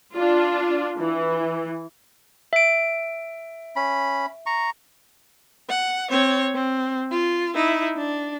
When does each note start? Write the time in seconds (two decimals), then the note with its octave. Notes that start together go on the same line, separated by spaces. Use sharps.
0.14 D4 F4
0.98 E3
2.53 E5 D7
3.76 C#4 B5
4.46 A#5 C#6
5.69 F#5
6.10 C4 C#5
6.54 C4
7.11 F4
7.55 D#4 E4
7.97 D4